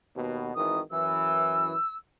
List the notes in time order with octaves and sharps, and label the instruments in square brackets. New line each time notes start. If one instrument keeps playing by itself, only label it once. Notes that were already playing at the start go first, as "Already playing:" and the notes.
[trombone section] D#2 B2
[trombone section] G#1 D#3 E3 [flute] D#6
[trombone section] F#2 E3 [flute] E6